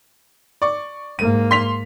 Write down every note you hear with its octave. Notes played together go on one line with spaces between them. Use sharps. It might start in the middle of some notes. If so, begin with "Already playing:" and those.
D5 C#6
G#2 A#3 D#7
C6 B6 F7